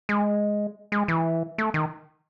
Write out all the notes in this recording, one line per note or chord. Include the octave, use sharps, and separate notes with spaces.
G#3
G#3
E3
A3
D#3